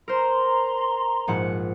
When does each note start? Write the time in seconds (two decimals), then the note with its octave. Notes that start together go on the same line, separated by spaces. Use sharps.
0.08 A#4 C5 A#5 C6
1.27 A#1 G#2 F#5